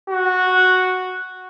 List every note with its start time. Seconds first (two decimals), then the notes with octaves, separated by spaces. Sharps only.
0.10 F#4